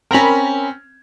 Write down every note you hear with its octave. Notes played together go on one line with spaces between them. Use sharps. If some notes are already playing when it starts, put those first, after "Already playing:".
C4 C#4 A#4 A#5 B5